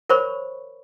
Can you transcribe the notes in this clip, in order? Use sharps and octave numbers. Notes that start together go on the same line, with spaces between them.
A#4 C5 C#5 B5 C#6